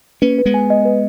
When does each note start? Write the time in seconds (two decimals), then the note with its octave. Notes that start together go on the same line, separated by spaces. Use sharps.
0.22 A#3 C#4 B4
0.38 B4
0.46 G#3 B3
0.54 G#5
0.70 D#5
0.85 B4